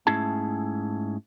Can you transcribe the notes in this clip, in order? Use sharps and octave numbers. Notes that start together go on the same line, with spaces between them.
G#2 A3 C#4 E4 G#4 A5